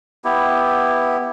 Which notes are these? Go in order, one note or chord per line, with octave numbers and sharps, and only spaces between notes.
B3 E4 G4